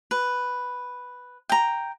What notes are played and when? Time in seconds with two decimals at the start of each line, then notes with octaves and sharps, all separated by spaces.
0.11 B4
1.49 G5 A#5